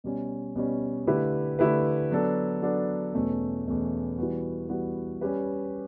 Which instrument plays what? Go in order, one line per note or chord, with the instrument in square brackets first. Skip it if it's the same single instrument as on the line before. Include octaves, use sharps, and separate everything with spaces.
[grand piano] B2 G3 C#4
B2 G3 C#4
D3 A3 E4 G4 B4
D3 A3 E4 G4 B4
F#3 B3 D4 A4
F#3 B3 D4 A4
E2 B2 A3 C#4
E2 B2 A3 C#4
E3 G3 B3 F#4
E3 G3 B3 F#4
G3 C#4 G4 B4